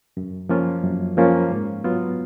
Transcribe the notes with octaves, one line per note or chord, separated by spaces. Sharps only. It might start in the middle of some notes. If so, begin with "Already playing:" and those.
F#2
F3 A#3 C#4 F4
F#2
F3 A#3 C#4 F4
G#2
F#3 B3 F4